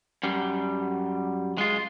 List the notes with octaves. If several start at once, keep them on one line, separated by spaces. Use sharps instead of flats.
F#2 G3
G#3 F4